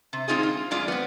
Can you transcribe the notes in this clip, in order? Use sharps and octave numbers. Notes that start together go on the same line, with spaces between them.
C3
G#3 A#3 C4 D#4 F4 G#4
F4
F#2 G#3 F4 D5
B3 C4